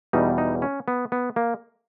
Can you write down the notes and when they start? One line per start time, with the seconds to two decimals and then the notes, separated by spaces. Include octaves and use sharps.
0.13 E2 B2 G3 D#4
0.38 D#4
0.62 C#4
0.88 B3
1.12 B3
1.36 A#3